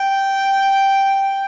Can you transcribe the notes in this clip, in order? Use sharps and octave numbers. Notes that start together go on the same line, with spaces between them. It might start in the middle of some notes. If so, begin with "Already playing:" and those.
Already playing: G5